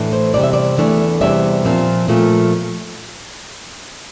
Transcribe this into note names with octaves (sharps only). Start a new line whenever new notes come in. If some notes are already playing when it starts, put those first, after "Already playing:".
Already playing: A2 E3 A3 D4
C5
E2 C3 G3 D5
E5
D5
E2 E3 A3 D4
E2 C3 G3 D4 E5
A#2 F3 C4
A#2 F3 A3